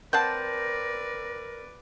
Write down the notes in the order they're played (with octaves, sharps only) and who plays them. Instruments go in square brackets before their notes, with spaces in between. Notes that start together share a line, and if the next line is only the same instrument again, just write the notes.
[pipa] C4 F#5 A5 [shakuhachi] A#4 [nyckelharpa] B4 D5 [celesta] G6